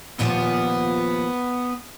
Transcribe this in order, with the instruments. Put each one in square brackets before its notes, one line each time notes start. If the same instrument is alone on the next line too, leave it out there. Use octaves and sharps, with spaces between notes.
[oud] D#2 A#2 F3 [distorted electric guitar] B3